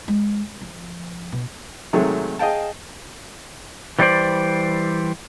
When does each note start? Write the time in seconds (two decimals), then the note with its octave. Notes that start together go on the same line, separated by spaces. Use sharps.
0.08 G#3
0.61 F3
1.32 B2
1.93 C3 D#3 F#3 G#3 A3
2.39 G#4 D#5 F5 G5 A5
3.99 E3 G3 A3 D4 C5 D5